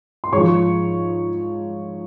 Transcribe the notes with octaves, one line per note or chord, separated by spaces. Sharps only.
C6
G#2 F3 C#5 C#6